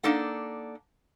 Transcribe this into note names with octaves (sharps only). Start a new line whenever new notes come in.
A#3 D4 D#4 A4 F#5